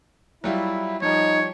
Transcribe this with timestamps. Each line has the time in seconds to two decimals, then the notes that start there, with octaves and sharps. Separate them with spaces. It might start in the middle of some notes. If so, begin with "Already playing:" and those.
0.44 F#3 G3 E4 F4
1.02 F3 G3 D#4 C#5